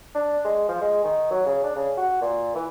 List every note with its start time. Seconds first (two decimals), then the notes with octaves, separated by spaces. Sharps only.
0.15 D4
0.45 G#3
0.69 F3
0.81 G#3
1.04 D#3
1.31 F#3
1.46 C#3
1.64 D4
1.76 C#3
1.97 F#4
2.21 A#2
2.55 E3